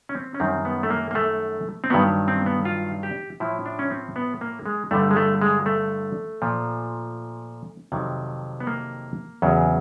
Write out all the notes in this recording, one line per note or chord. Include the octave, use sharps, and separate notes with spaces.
C#4
C4
C#4
F#2 D#3 G3 C4
B3
A3
A#3
A#3
A3
C4
G2 D#3 F#3 B3
C4
B3
F4
G4
A2 F3 E4
D4
C#4
C4
B3
A#3
G#3
G2 D3 G3 A3
G#3
A3
G#3
A3
A#2 F3
F2 C3 D#3 F#3
B3
A#3
E2 C#3 F#3